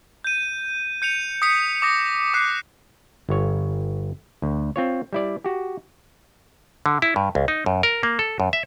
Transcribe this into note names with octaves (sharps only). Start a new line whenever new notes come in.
G6 D#7
G6 C#7 D#7 F7
D#6 B6 C#7
D6 D#6 A#6
D6 D#6 F#6 C7
G1 C#5
D2
C4 F4 C#5
G3 E4 D5
F#4 G4
D3
E4
G2
C#2
D#4
F#2
A#4
A#3
A4
F#2
E5